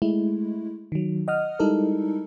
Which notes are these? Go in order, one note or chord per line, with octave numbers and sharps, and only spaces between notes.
G#3 A3 E4
D#3 F#3
D#5 F#5 D#6 F6
G3 G#3 D#4 E4 A4 A#4